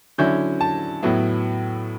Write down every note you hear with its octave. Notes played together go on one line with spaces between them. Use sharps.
D3 F#3 C#4 E4 G6
A5
A2 F#3 B3 E4